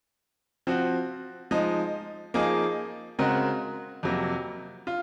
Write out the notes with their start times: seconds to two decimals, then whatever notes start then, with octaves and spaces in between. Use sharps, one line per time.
0.67 F3 C4 F#4
1.51 F3 G#3 D#4
2.34 F3 A#3 D#4 G#4
3.19 C#3 G#3 C4 F#4 A#4
4.03 F2 C3 F#3 A#3
4.87 F4